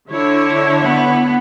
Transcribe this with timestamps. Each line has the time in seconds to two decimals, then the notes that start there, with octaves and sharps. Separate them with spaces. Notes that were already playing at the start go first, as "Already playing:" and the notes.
0.10 D3 E4 C#5
0.82 B3